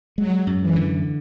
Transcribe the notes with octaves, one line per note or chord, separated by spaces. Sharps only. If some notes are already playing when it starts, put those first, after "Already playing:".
F#3 G#3
F#2
E3
D3